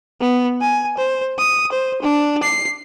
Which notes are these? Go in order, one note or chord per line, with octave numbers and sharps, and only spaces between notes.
B3
G#5
C5
D#6
C5
D4
C7